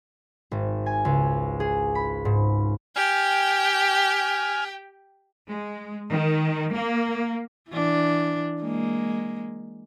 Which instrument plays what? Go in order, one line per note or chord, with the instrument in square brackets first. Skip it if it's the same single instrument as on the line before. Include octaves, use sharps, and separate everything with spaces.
[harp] G#1
G#5
C#2
G#4
B5
G#2
[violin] G4 G5 [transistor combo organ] G#5 F6
[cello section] G#3
D#3
A#3
[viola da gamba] E3 D4
G#3 A#3